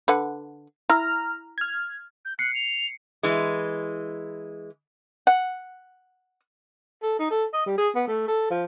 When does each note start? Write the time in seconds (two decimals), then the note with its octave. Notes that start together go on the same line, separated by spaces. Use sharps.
0.08 D3 B4 F#5
0.90 E4 A#5 F6
1.58 F6 G#6
2.25 G6
2.39 F#6 C7 C#7
2.55 F7
3.23 E3 G#3
5.27 F#5
7.02 A4
7.19 D#4
7.30 A4
7.53 D#5
7.66 G3
7.78 G#4
7.95 B3
8.07 A3
8.28 A4
8.50 F3